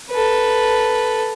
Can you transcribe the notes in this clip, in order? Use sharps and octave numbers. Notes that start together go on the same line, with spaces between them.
A4 B4